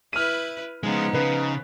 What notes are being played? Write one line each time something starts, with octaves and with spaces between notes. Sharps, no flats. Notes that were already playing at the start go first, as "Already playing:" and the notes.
E4 B4 F6 D#7
C#3 F3 G#3 B3 D#4
C#3 B4